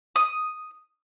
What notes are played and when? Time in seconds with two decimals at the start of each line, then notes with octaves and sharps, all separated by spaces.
0.16 D#6